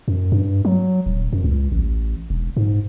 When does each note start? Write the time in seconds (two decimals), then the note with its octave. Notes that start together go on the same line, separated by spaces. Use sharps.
0.08 F#2
0.32 G2
0.65 F#3
1.06 D#1
1.33 F#2
1.44 C#2
1.72 A1
2.30 E1
2.57 G#2